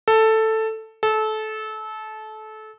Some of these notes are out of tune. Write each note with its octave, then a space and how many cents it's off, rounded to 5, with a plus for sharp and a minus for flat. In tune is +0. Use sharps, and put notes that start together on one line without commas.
A4 +5
A4 -25